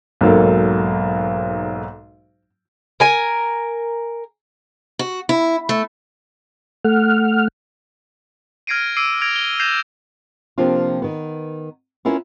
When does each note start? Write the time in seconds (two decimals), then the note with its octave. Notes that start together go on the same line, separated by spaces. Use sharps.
0.21 B1 G#2 F#3 A#3 A4
3.00 A#4 G#5
4.99 F#4
5.29 E4
5.69 A3
6.85 A3 F#5 F6
8.67 F6 G#6 A#6 C7 D7 D#7
8.97 D6 E6 C7 D7 D#7
9.22 F6 G#6 A#6 D7 F7
9.36 G7
9.60 G6 G#6 A#6 C7 E7 F7
10.58 C3 F3 A#3 C4 D4 F4
11.02 D#3 B3
12.05 B3 C#4 E4 F4 A#4